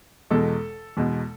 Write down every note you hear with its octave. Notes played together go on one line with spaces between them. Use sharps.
E2 B2 G#3 A4
E2 B2 G#3